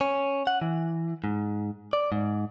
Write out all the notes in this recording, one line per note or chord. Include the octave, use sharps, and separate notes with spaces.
C#4
F#5
E3
G#2
D5
G#2